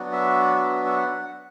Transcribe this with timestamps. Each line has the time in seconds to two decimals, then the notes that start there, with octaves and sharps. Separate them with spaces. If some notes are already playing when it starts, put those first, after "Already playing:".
Already playing: F#3 B3 D4 F#4
0.13 E5
0.55 E5
0.86 E5
0.96 F#5